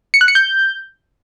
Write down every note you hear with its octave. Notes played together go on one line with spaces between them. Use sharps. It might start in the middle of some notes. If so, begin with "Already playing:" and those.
C#7
F#6
C#7
G6